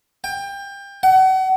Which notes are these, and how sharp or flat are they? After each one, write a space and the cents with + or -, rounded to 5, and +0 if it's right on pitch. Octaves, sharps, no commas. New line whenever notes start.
G5 +25
F#5 +35